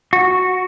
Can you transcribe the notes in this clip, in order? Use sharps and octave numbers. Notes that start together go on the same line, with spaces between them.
F#4